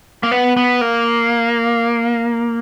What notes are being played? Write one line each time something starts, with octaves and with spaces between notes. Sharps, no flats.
A#3
B3
B3
A#3